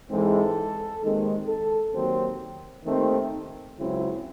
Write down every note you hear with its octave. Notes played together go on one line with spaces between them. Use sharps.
G#2 E3 G#3 C4 A4
D#2 D#3 G#3 C4
A4
D#2 D#3 F#3 C4
D#2 D#3 A3 C4
C#2 C#3 F#3 C4 E4